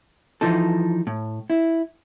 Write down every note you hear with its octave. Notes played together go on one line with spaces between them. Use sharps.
E3 F3 D#4 A4
A2
E4